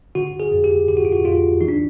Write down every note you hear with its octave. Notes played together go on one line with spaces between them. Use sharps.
D3 F#4
G#4
F2
G4
D3 G4
F#4
F4
F#4
F2 F4
E3 D#4
D4